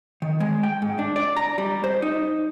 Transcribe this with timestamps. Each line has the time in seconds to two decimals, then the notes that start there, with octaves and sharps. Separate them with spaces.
0.22 D#3
0.40 G#3
0.63 G5
0.82 G#2
0.99 D4
1.16 D5
1.36 A#5
1.58 G3
1.84 C5
2.02 D#4